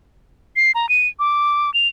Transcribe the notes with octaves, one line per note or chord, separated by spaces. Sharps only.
C7
A#5
D#7
D6
F7